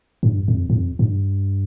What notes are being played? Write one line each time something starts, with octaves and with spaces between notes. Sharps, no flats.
G2
F2
G2
F2
G2